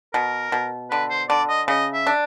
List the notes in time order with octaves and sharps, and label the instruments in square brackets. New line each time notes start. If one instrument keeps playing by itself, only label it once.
[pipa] B2 [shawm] A#4
[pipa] B2
[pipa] D3 [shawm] B4
[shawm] C5
[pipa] D3 [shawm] D5
[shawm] D#5
[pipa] C#3 [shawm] D#5
[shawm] E5
[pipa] D4